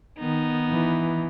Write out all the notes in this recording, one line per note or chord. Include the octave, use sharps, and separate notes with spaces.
D#3 B3 D#4
E3